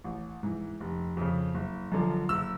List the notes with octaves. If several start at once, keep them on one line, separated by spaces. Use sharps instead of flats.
A1
G#2 E3
F1
F2 C#3
F#1
F#2 D3 F3
F#1 E6